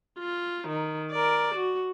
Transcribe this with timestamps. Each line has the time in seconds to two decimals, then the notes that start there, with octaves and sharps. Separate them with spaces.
0.19 F4
0.68 D#3
1.11 A#4 D5
1.54 F#4